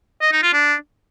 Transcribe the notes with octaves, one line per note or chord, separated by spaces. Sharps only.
D#5
D#4
F4
D4